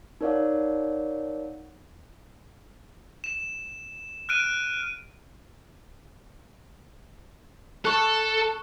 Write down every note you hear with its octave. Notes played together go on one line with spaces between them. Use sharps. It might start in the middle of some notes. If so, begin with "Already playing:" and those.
D#4 A#4 C#5 D5 F5 F#5
E7
F6 F#6 D7 D#7
A4 C#6 F#6